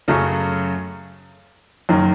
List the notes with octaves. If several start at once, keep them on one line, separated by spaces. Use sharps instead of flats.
F#2 C#3 F#3 A3 C#4
F#1 F#2 D#3 F#3